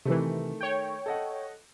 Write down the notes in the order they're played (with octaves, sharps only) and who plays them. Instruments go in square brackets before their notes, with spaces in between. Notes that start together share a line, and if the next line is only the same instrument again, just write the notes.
[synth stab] C3 E3 [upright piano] D#3 A3
[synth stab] C#5 G5
[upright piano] A4 D#5 F#5